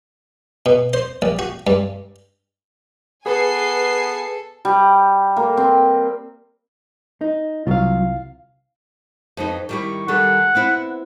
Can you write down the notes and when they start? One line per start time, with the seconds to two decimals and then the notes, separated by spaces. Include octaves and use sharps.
0.66 B2
0.93 C5
1.22 A#1
1.39 F#4
1.67 G2
3.26 B3 G#4 A4 B4 G#5 C7
4.65 G3
5.37 A#3
5.57 C4
7.21 D#4
7.67 C2 F#3 F4 F5
9.37 F2 B3 D#4
9.69 D#3 G3 E4 C#6
10.08 D#3 G3 A4 F#5
10.55 B3 C4 E4